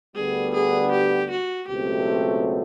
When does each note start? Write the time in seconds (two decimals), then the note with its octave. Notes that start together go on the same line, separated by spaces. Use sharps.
0.15 D2 D3 G3 B3 G#4
0.54 G#4
0.92 G4
1.31 F#4
1.68 C#2 B2 F#3 A3 C4 G4